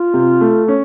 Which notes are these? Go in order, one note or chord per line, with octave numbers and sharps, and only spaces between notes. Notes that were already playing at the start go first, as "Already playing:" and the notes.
Already playing: F4
C3
A3
C#4